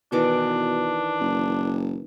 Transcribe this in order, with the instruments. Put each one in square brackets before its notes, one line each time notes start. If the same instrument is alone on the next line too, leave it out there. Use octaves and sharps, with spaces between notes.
[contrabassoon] B2 [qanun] D#3 E3 D6 [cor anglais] D4
[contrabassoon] F#1